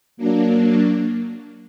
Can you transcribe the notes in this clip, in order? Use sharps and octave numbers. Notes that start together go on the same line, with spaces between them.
F#3 A#3 D4